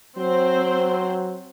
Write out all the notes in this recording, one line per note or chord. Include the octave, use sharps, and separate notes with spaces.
F#3 C4 C5